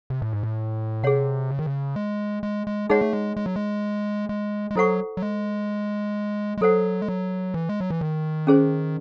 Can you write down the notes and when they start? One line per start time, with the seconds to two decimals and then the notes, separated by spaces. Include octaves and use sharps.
0.10 C3
0.22 A2
0.33 G#2
0.43 A2
1.03 C3 G#4 C#5 F#5
1.51 C#3
1.59 D#3
1.66 C#3
1.96 G#3
2.43 G#3
2.67 G#3
2.89 G#3 D#4 G#4 C#5 F#5
3.01 A3
3.13 G#3
3.37 G#3
3.46 F#3
3.56 G#3
4.29 G#3
4.71 G#3
4.75 F#3 E4 A4 C5 F#5 C#6
5.17 F#3
5.22 G#3
6.57 G#3
6.61 F#3 A4 C5 F#5
7.02 G#3
7.08 F#3
7.54 E3
7.69 G#3
7.80 F#3
7.90 E3
8.01 D#3
8.47 C#4 G#4 C5